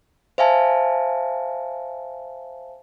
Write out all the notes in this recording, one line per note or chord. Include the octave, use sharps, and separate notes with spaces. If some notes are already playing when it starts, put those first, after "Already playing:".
C5 E5 F5 G#5 A5